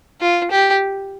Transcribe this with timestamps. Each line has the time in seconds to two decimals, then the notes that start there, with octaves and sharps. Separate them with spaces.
0.21 F4
0.51 G4